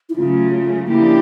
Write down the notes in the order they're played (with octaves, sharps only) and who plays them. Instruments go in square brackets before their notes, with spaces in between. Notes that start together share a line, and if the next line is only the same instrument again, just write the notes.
[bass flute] E4
[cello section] C#3 F#3 A3 [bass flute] F4
[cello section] C#3 F3 A#3 D4 G4 [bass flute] E4